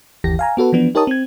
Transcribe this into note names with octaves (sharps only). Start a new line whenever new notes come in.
G1 D#2 E3 G4 A#6
F5 G#5 A#5
B3 F#4 A4 B4
E3 F3 B3 D4
D#4 G4 A#4 C#5 A5 D#6
C4 G#6